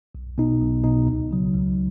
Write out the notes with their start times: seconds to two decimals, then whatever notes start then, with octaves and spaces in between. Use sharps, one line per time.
0.15 B1
0.38 B2 B3 D#4
0.61 B1
0.84 B2 B3 D#4
1.07 C#2
1.31 C#3 F#3
1.54 C#2